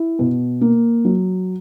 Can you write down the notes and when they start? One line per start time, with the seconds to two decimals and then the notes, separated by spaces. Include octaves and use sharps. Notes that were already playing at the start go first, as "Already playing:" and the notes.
Already playing: E4
0.19 B2
0.61 A#3
1.05 F#3